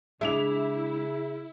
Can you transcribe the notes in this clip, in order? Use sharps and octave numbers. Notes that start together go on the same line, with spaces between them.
C#3 G#3 D4 E4 E5 F7